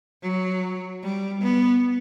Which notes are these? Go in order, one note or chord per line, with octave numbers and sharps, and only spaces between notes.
F#3
G3
B3